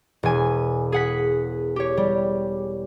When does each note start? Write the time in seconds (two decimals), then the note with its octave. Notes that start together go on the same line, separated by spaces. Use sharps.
0.23 E1 G#5
0.92 G#4 F#5 B6
1.76 G4 C#5
1.97 G3